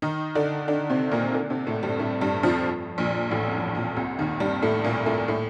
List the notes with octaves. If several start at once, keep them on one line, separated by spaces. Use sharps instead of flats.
D#3 D#4
D3 D4
D3 D4
C3 C4
A#2 A#3
D3 D4
C3 C4
A2 A3
G2 G3
A2 A3
G2 G3
F2 F3
A#1 A#2
A1 A2
F2
G2
A#1 A#2
C2 C3
D#2 D#3
G2 G3
A2 A3
A#2 A#3
A2 A3
A2 A3